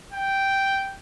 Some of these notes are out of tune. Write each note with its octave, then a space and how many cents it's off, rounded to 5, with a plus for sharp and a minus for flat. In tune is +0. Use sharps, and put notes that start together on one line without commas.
G5 -5